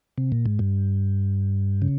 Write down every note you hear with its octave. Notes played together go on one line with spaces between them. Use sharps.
C3
A#2
G#2
G2
C#3